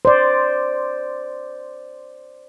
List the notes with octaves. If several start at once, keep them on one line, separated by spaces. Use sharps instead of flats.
C5 D5